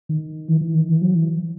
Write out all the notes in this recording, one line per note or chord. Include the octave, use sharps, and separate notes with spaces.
D#3
E3
E3
D#3
E3
F#3
E3